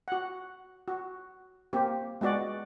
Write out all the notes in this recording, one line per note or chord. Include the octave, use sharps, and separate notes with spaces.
F#4 F#5
F#4
A#3 C4 G4
G#3 B3 F#4 D5